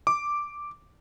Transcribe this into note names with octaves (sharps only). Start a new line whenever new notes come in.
D6